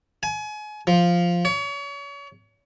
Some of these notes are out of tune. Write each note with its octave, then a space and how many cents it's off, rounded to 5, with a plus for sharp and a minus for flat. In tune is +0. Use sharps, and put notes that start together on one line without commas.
G#5 +30
F3 +0
C#5 +35